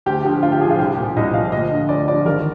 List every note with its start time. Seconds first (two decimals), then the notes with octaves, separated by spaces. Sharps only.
0.06 D2 G4
0.24 D3 F3 G4
0.42 D2 F4
0.52 G4
0.61 F3 G#4
0.65 D3
0.70 F4
0.79 C2 G4
0.97 A#2 F3
1.17 C2 D#5
1.34 A#2 F3 F5
1.52 D2 D#5
1.71 D3 F3
1.89 D2 D5
2.08 D3 F3 D5
2.26 G#1 A#4